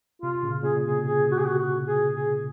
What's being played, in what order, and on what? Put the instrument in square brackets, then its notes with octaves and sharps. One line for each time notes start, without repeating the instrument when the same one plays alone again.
[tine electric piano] C3 [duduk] F4
[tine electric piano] A#2 C#3
[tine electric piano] A#2 C#3 [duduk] G#4
[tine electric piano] A#2
[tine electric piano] C3 [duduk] G#4
[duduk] G#4
F#4
G#4
F#4
F#4
G#4
G#4